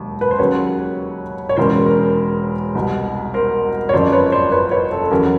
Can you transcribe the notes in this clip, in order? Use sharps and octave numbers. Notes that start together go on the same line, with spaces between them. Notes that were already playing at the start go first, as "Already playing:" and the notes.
Already playing: E1 D#2 F#3
B4
C5
D#2 C#3 F#3 B4 C#5
C#5
E1 E2 C#3 A#4 C5
A#4
C2 B2 G3
A#4 C5
C#5
F#1 F2 C#3 F3 C5 D5
B4 C#5
C5 D5
B4 C#5
B4 C#5
A4
A4
E2 C#3 F#3 A#4